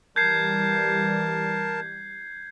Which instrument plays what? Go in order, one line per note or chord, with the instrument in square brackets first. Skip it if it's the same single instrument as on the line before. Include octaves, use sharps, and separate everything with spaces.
[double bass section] E3 G3 [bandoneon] A#4 A5 [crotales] G6 G#6 C7